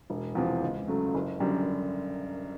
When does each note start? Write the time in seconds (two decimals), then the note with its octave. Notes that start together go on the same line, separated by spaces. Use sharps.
0.10 E1
0.35 E2 C3 F3
0.62 C#2
0.88 C#3 F#3 A3
1.14 F#1
1.40 F#2 D3 G3